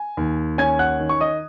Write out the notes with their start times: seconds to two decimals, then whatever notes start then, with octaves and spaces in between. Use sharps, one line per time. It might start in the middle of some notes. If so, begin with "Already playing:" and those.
Already playing: G#5
0.17 D#2
0.58 C#4 G#5 G#6
0.79 F#5 F#6
0.99 D#3
1.09 C#6
1.20 D#5 D#6